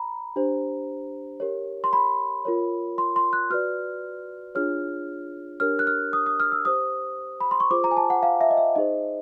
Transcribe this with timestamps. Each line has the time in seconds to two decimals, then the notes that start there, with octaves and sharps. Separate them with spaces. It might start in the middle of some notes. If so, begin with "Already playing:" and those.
Already playing: A#5 B5
0.36 D4 G4 C5
1.40 G4 A#4 C#5
1.84 C6
1.93 B5
2.45 F4 A#4 C#5
2.98 C6
3.16 C6
3.33 F#6
3.50 F#4 B4 D5 F6
4.55 D4 F4 G#4 C#5 F6
5.60 D4 G4 A#4 C#5 F6
5.79 F#6
5.87 F6
6.13 D#6
6.26 D#6
6.40 F6
6.52 E6
6.65 G4 C5 D#6
7.40 B5
7.51 C6
7.60 C#6
7.71 F4 G#4 C5 D6
7.84 A#5
7.91 G#5
7.97 A5
8.10 F#5
8.23 F5
8.41 E5
8.50 D#5
8.57 E5
8.76 D#4 G#4 C5 D#5